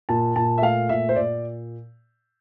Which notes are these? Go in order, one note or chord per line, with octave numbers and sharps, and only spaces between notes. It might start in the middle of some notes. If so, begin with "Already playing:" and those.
A#2 A5
A#2 A5
E5
A3 F5
A#2 E5
C5
A#2 D5